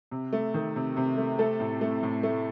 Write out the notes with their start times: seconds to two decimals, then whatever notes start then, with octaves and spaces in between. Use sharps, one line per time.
0.11 C3
0.33 A3
0.54 D#3
0.76 C3
0.97 C3
1.17 A3
1.39 A3 A4
1.60 A2
1.81 A3
2.03 A2
2.23 A3